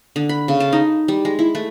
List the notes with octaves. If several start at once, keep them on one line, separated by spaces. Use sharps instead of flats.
D3
B5
C#3
A5
D#4
G3
G#3
E4
A3